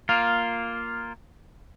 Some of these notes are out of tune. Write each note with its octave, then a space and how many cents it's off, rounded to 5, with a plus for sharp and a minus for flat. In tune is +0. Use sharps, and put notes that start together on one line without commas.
A#3 +0 F4 +0